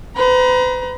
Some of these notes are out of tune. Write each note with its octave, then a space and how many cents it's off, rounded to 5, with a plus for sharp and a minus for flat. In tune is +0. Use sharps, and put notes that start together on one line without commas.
B4 +45 A#5 +35